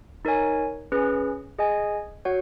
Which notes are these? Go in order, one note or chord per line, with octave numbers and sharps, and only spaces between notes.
D#4 A#4 C#5 G#5
C#4 G#4 B4
G#4 D#5 G#5
F#4 C#5 F#5